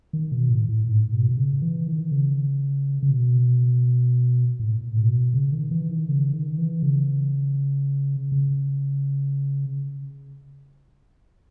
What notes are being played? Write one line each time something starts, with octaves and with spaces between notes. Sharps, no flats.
D#3
B2
A2
A2
G#2
B2
B2
C#3
E3
D#3
C#3
C#3
B2
A2
B2
C#3
D#3
E3
D#3
C#3
D#3
E3
C#3
C#3